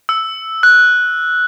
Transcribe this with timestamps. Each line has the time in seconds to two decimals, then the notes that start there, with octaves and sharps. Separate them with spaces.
0.09 E6
0.63 F#6